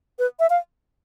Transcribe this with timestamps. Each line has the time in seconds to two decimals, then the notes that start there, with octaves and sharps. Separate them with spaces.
0.19 B4
0.40 E5
0.50 F5